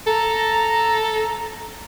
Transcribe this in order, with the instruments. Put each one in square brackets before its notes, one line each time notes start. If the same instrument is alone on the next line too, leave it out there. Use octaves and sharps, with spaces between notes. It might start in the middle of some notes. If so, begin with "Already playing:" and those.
[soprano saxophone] A4 [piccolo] A#5